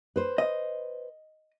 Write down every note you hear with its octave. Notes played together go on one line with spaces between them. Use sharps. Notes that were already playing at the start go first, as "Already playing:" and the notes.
B4 C5
D#5